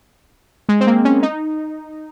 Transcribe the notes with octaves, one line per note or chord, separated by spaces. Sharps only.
G#3
C4
A#3
C#4
D#4